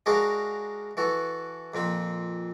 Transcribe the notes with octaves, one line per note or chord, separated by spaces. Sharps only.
G#3 D4 F#4 G#4 A#4 F5
E3 F#4 A4
F2 A#2 C4 B5